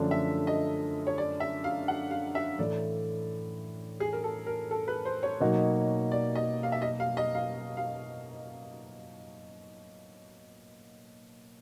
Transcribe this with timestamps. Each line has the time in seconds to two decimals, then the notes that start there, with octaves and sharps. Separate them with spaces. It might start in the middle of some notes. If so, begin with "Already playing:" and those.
Already playing: F#2 D3 F3 A3 D4
0.11 E5
0.47 D#5
1.07 C#5
1.18 D5
1.40 E5
1.64 F5
1.88 F#5
2.11 F5
2.35 E5
2.58 A2 E3 A3 D5
4.00 G#4
4.13 A#4
4.24 A4
4.46 A#4
4.71 A4
4.88 B4
5.05 C5
5.23 C#5
5.40 B2 F#3 A#3 D#4 F#4
6.12 D5
6.35 D#5
6.63 F5
6.72 E5
6.82 D#5
7.00 F5
7.17 D#5
7.35 F5
7.77 F5